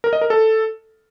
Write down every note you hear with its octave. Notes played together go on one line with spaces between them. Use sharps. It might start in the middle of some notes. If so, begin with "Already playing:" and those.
A#4
D#5
A#4
A4